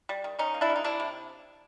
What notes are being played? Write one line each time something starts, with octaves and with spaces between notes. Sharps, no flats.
G3
D#3
D#3 C#4 D#4
A#3
D4 E4
G3
D#4
C3 D4 E4
C3